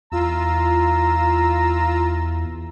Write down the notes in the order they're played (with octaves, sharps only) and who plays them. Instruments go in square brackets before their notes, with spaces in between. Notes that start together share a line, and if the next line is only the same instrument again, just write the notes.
[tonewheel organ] E2 [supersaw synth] F4 E6 [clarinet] A#5